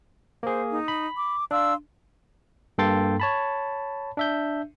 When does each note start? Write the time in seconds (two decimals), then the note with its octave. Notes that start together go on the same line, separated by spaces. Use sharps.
0.43 A#3 G#4 C5
0.73 D#4
0.88 B5
1.17 D6
1.51 D4 F5 C6 E6
2.78 G2 A#3 A4 G5 C6 A6
3.20 C#5 A5 B5
4.17 D4 E5 G6